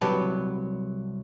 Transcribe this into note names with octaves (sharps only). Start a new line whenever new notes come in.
C2 F#3 G4 B4 A5